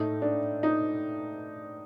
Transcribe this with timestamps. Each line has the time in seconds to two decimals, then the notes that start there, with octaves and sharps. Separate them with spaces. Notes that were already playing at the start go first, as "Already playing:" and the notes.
Already playing: A2 A3 D#4
0.22 D4
0.63 D#4